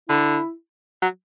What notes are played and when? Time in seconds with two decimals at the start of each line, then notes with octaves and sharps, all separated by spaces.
0.09 D3 E4
1.02 F#3